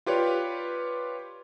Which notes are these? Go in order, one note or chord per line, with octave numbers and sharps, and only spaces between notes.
F4 G4 B4 C#5 D5